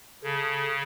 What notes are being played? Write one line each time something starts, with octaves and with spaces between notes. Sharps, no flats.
C#3 A4